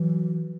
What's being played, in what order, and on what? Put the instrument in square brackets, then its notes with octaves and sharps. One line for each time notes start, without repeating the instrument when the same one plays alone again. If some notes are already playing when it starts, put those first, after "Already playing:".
Already playing: [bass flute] E3 [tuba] F#3